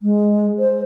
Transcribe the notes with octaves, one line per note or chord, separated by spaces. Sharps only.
G#3
C5